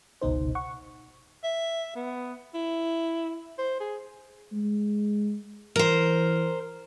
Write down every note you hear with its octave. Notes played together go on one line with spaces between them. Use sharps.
G1 C#2 B2 D#4 C5
F#5 C#6
E5
B3
E4
C5
G#4
G#3
E3 A#4 C5